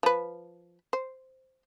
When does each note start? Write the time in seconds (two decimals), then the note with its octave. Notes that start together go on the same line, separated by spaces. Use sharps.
0.03 F3 B4
0.93 C5